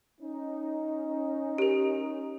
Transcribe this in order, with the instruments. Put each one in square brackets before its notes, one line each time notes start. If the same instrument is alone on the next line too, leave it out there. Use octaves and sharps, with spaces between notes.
[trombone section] C#4 D#4
[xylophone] G4 A#4